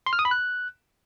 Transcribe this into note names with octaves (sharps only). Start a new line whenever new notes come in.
C6
F6
D#6
B5
F#6